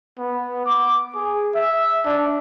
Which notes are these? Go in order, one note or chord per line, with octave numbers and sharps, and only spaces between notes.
B3
D6
G#4
E5
D4